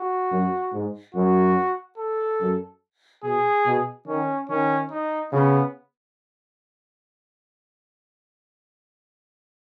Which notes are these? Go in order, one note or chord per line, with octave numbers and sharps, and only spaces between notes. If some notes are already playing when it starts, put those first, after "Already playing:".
Already playing: F#4
F#2
G#2
F#2 F#4
A4
F#2
B2 G#4
B2
D#3 C#4
D#3 C#4
D#4
C#3 B3